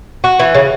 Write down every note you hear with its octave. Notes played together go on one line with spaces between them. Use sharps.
F#4
E3
C#3